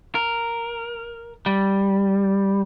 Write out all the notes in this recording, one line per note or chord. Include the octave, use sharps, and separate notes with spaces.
A#4
G3